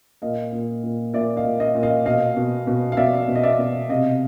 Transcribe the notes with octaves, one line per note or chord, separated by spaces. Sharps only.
A#2 D#5 F5
A#2
A#2
A#2 D5 E5
D#5 F5
A#2
D#5 F5
A#2
D#5 F5
B2 D#5 F5
B2
B2
F5
B2 D5 E5
B2
D#5
D5 E5
B2
C3 D#5 F5